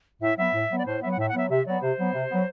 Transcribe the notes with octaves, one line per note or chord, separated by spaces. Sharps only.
A2 E5
F#3 B3 E5
A2
F#3 B3
D5
A2 C5
F#3 B3 E5
F#5
A2 E5
F#5
F#3 B3 E5
C3 E5
F#3 B3 D5
C3 C5
F#3 B3
C3
F#3 B3